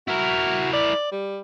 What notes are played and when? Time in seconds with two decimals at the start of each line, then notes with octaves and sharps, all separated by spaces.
0.08 E4 F#4 A#4
0.73 D5
1.12 G3